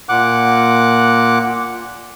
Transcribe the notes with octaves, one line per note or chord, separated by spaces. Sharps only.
A#2 F#5 D6 F#6